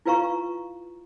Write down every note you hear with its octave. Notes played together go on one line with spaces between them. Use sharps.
E4 F4 B4 F5 A#5 C#6